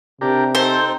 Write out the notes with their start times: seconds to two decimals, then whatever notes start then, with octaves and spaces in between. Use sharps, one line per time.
0.21 C3 D4 G4 A#4
0.55 C4 D#4 A4 C5